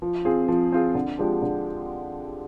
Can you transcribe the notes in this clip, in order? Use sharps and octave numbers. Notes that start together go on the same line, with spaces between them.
F3
C4 F4 G#4
F3
C4 F4 G#4
D3
F3 G#3 D4 G4
D3